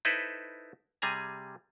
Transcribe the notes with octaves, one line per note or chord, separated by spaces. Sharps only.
D#4 E4 A4 B4 C5
C3 G3 G#4 G#5 A#5